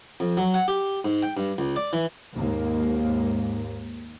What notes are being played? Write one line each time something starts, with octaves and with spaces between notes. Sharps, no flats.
F2
F#3
F#5
G4
G#2
G5
G2
C#2
D5
E3
D#2 G#2 A#3